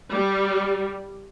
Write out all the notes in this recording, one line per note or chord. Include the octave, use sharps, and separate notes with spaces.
G3